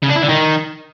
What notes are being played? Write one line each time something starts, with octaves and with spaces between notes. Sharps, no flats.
C#3
D4
E4
D3
D#3